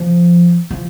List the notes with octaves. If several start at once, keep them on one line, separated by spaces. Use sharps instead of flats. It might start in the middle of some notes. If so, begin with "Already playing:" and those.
Already playing: F3
F3